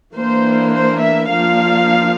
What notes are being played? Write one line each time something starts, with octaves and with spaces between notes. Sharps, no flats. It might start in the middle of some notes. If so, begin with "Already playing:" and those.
E3 A#3 D4 C5
C5
E5
F3 A#3 D4 F5